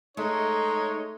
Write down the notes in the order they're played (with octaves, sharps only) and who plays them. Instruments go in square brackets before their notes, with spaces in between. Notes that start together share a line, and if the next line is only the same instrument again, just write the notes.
[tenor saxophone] G#3 [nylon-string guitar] A3 [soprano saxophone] D#4 [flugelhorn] C#5